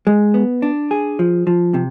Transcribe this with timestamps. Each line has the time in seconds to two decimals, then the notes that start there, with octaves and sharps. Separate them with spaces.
0.07 G#3
0.34 B3
0.62 D4
0.91 G#4
1.19 F3
1.47 F3
1.74 C3